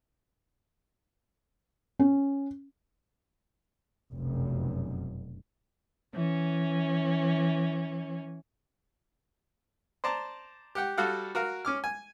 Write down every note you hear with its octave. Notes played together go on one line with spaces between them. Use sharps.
C#4
F1 B1 F#2
E3 C#4
C5 D5 A5 A#5
G4 F#5 G5
G3 F#4 A4 F5 F#5
F#4 A#4 F5
C#4 D6 F6
G#5